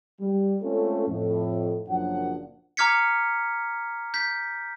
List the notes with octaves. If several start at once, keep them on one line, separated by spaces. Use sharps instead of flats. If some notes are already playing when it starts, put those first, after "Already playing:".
G3
G#3 A3 C4 C#4 F4 A4
F2 A2
F#1 F#2 A#2 F3 D4 F#5
A#5 D6 F6 G#6 B6 C#7
G6 B6